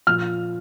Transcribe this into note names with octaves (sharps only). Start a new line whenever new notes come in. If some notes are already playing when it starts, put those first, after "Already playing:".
A#2 F3 F6